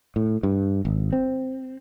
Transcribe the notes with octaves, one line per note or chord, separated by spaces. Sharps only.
A2
G2
G#1
C4